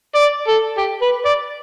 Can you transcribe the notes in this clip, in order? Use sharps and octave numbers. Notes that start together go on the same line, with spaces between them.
D5
A4
G4
B4
D5